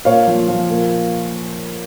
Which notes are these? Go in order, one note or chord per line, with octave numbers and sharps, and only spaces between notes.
A#2 C#5 F5
F3
F3
A#2